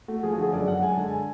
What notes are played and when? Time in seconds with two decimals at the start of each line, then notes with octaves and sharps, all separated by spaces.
0.08 A3 F#4
0.23 F3 G#4
0.33 F#4
0.38 D3 G#4
0.53 F#2 D5
0.67 F#2 F#5
0.82 G#3 G#5
0.95 D3 A5
1.06 G#5